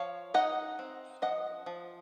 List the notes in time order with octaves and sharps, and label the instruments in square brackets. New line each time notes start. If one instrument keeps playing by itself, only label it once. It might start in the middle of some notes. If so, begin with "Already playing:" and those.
Already playing: [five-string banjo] F3 C#5 F5
D#4 D#5 F#5
C4
F3 D#5 F#5
F3